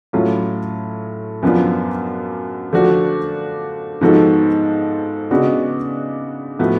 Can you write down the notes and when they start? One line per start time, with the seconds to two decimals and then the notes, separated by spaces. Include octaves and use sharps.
0.13 A2 F#3 C#4 F4
1.43 F#2 F3 B3 D4 F4
2.72 D3 F3 A3 D4 F#4
4.01 G#2 F3 B3 F#4 A4
5.31 C#3 G#3 B3 D4 F#4
6.59 A2 F3 B3 F#4